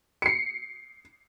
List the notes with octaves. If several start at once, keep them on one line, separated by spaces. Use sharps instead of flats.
C7 C#7